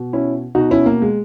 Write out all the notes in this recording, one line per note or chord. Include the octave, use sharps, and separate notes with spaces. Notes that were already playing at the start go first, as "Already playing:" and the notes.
Already playing: B2
C#4 E4
B2 D#4 F#4
C#4 E4
A#3
G#3